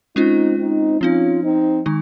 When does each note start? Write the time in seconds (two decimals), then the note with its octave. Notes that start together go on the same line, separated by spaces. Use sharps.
0.16 G#3 C4 C#4 D#4 F4
0.58 C4 D#4
1.00 F3 C4 C#4 D#4 F4
1.43 C4 D#4
1.86 D#3 G#3 D#4